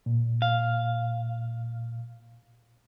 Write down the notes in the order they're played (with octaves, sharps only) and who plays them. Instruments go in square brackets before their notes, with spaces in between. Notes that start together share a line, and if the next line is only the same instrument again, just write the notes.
[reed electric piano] A#2
[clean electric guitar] F5